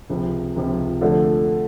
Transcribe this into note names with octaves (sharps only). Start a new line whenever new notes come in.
C#2 C3 F3
C#2 C3 F3
D3 F3 A3